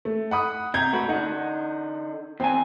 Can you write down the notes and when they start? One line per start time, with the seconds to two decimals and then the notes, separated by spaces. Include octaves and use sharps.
0.05 A3
0.31 F#5 B5 D#6
0.74 C3 A#5 G6 G#6
0.93 A3 F#4 B4
1.09 D3 D#4 F#5
2.40 E2 C4 G#5